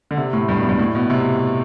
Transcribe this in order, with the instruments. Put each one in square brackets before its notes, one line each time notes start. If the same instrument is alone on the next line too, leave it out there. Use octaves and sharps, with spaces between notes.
[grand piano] D3
C3
A2
G2
B2
G2
A2
B2
C3